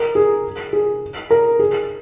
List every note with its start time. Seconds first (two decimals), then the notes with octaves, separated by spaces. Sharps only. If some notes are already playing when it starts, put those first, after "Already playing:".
Already playing: A#4
0.15 G#4
0.73 G#4
1.31 A#4
1.59 G#4